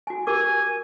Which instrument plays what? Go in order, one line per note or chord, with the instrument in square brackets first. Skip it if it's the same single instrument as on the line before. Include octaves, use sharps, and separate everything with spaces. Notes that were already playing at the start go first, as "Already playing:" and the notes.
[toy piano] F#4 G#5
[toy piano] G4 A#4 D6 [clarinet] G#5